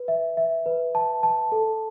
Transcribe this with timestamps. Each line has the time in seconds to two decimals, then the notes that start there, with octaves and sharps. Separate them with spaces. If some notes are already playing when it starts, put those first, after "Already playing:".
Already playing: B4
0.08 E5
0.37 E5
0.66 B4
0.95 A5
1.23 A5
1.52 A4